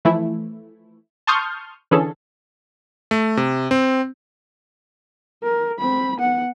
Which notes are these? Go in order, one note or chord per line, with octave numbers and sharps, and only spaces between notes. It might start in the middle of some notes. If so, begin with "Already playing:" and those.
E3 F3 A3 E4
A5 C6 C#6 D#6 F6 G6
D3 E3 C#4 G#4 A4
A3
C3
C4
A#4
C4 B5
B3 F#5